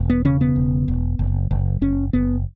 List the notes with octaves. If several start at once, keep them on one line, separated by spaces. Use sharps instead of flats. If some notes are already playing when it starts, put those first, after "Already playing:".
Already playing: E1
B3
C#3 C#4
B3
E1
E1
F#1
F#1
F#1 C#4
F#1 B3